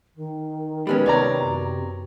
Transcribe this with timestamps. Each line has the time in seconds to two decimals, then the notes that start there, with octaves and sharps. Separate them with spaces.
0.15 D#3
0.87 G3 G#3 B3 C#4 B4
1.06 C3 C#5 D5 A#5
1.40 F#2